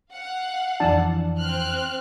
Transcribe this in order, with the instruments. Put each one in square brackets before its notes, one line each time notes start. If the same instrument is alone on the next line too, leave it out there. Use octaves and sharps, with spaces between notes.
[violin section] F5 F#5
[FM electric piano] F2 E3 F3 [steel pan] D4 D5 A5
[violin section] C4 F6 F#6